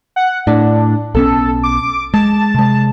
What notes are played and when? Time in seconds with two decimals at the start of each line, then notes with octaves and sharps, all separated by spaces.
0.16 F#5
0.47 A2 D4
1.15 B1 B3 C#4 A4
1.63 D6
2.14 G#3 A5
2.54 C3 G#3